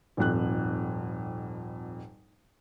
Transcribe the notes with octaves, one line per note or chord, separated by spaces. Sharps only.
D#1 G#1 F2 F#6